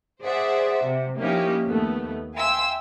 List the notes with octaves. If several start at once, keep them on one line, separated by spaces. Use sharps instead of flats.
G#4 C5 D5 E5 F#5
C3
F3 A#3 C#4 D#4 E4 G4
D#2 A3 B3
E5 F5 G5 G#5 C6 E6